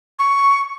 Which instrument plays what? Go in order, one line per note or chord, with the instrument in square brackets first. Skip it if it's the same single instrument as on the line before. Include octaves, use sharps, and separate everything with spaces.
[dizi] C#6